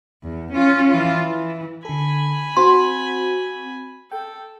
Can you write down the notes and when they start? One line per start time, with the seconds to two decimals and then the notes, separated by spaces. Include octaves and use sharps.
0.24 E2
0.53 C#4 F4
0.89 E3 F4
1.22 E3
1.85 D3 A4 G#5 B5
2.57 C4 F#4 C6
4.12 A4 G5